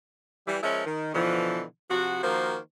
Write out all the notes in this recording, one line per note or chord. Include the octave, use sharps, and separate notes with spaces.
E3 G3
F3 G#3 C#4 A#4 E5
D#3
B2 D3 E3 F3
C3 F3 F#4
D#3 F3 A#3 F#4 C5